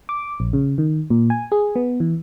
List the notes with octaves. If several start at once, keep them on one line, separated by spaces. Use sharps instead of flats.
D6
A#1
C#3
D#3
A#2
G#5
G#4
B3
E3